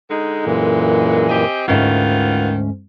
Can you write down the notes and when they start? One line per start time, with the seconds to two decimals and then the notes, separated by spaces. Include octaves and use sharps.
0.11 D3 G#3 D#4
0.46 F#2 A#2 E3
1.29 C4 G4 D#5 G#5
1.68 D2 G#2 D#3 E3 C#4 F4 F#5